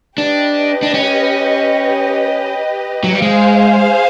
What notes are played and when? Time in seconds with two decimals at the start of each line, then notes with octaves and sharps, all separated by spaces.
0.18 D4 G4 B4 D#5
0.83 D4
0.94 C#4
3.04 F#3
3.13 G3
3.22 G#3 G#4 C5 F5